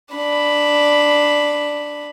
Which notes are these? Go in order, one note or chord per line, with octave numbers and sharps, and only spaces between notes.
D4 B5